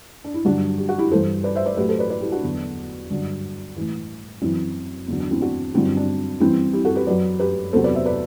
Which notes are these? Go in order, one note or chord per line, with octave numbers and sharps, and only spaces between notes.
D4
E4
G2 D3 F#3 D4 F#4
G4
F#4
E4 G4
G2 E3 A4 C5
B4 D5
C5 E5
B4 D5
A2 F#3 G4 B4
A4 C5
B4 D5
B4 D5
E4 G4
D4 F#4
E2 D3 F#3
G2 D3 F#3
A2 E3
F#2 E3 C4 E4
E2 D3 F#3 D4
D4
C4 E4
D4 F#4
G2 D3 F#3 C4 E4
D4
D4
G2 E3 C4 E4
E4 G4
F#4 A4
G4 B4
F#2 F#3 B4 D5
G4 B4
E2 C3 F#3 A4 C5
B4 D5
C5 E5
B4 D5